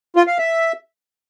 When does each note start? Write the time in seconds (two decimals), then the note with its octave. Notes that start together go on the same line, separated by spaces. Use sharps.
0.16 F4
0.27 F5
0.38 E5